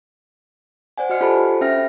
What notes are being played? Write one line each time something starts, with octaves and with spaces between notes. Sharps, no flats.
C5 D5 F#5 G#5
F#4 D#5 F#5 F6 C#7
F4 G4 A4 C5 A5 B5
C5
C#4 E5 G5 F6 A#6